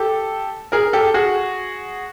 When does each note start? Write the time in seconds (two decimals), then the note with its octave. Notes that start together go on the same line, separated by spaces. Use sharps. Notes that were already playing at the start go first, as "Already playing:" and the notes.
Already playing: G4 A4
0.72 G#4 A#4
0.93 G4 A4
1.14 F#4 G#4